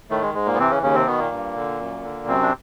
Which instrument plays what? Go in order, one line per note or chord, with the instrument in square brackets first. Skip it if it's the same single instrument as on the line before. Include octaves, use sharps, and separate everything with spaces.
[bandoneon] A2 D#3 A3
G#3
G#2 G#3
A#2 A#3
B3
C3 E3 C4
C#3 C#4
D#2 C#3 C#4
C3 C4
B2 D#3 B3
A#2 A#3
G2
D3
F#2
D3
F#2 C3 C4
D4